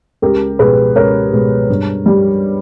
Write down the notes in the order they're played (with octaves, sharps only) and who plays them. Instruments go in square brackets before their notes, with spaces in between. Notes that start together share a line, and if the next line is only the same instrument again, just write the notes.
[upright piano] C#2 G4 A#4
B2 G#3 G#4 B4
C#2 A#4 C#5
B2 G#3
G2
G3